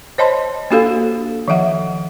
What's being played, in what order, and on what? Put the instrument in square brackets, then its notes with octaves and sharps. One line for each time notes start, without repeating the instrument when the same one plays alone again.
[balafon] C5 C#5 D#5 A5 B5 C6
A#3 D4 F#4 G4 A4 F5
D#3 F3 E5 F#5